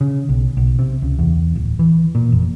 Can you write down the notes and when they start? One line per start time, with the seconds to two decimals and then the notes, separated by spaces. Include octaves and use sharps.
0.01 C#3
0.29 B1
0.57 B1
0.79 C3
1.02 C#2
1.19 E2
1.55 D1
1.79 E3
2.15 A#2
2.32 F1